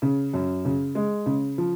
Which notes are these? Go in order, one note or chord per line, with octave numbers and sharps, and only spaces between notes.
C#3
F#2
C#3
G#3
C#3
F3